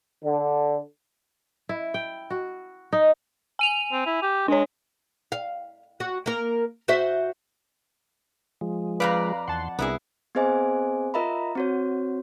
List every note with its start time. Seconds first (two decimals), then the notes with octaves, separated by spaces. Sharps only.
0.24 D3
1.69 E4
1.94 G5
2.30 F#4
2.92 D#4
3.59 G#5 D#7 F7
3.92 C4
4.06 E4
4.22 G4
4.48 G#3 D4 C#5
5.32 F5
6.00 F#4
6.26 A#3 A#4
6.88 F#4 C5 E5
8.61 F3 G#3
9.00 F2 G#2 B4 D5 F5 A#5
9.48 E2 F#5 A5 C6
9.79 C2 B3 D4 E4 G#4 A#4
10.35 B3 C4 G#4 C5 D#5 G#5
11.14 F4 A#4 D#5 E5 A#5 B5
11.55 C4 F#4 C#5